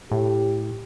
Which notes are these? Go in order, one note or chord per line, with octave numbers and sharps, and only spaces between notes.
A2 G4